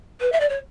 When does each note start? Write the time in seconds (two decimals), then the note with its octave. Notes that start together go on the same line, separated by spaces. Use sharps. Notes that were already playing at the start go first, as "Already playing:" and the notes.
0.20 B4
0.32 E5
0.40 D5
0.49 C#5